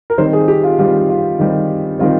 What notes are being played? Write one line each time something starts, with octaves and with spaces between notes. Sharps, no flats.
A#4
D#3 G3 C4 C5
G#4
G4
F4
D#3 G3 C4 F4
F4
D#3 G3 C4
D#3 G3 C4 F4